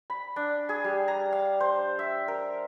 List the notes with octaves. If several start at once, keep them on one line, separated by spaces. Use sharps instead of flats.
B5
D4
G#4
G3
A#5
F5
C5
E5
A#4